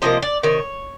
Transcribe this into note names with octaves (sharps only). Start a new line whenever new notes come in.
C3 F3 A#3 D#5
D5
C3 D#3 C#5